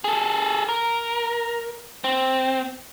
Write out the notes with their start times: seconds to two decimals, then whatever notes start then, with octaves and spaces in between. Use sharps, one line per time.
0.04 G#4 A4
0.69 A#4
2.04 C4